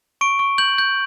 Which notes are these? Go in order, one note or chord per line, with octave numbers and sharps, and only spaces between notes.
C#6 D7
C#6
G6 F#7
G6